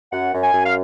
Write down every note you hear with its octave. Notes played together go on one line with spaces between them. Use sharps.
F#2 F#5
F#2
G#5
F#2
F5